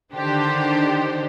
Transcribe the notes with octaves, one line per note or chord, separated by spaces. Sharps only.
D3 D#3 D4 G4 C5